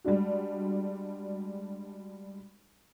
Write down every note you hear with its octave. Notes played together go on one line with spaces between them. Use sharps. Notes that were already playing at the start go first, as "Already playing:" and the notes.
G3 G#3 D4 F#4